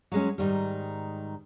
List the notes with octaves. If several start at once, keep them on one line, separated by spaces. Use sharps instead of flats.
F#3 G#3 C#4
G#2 D#3 G3